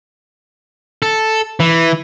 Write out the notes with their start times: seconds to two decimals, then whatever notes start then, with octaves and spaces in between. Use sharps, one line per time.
1.02 A4
1.60 E3